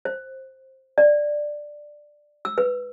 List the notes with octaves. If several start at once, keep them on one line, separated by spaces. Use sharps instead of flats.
C5
D5
E6
B4